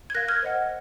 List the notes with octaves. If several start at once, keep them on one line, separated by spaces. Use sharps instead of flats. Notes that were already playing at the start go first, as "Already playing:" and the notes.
G#6
A#4 F5 F#6 A#6
F6 G#6
C5 D#5 F#5